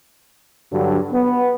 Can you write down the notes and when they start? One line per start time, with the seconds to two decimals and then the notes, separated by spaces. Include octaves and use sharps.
0.72 G2 D3 F#3
1.12 B3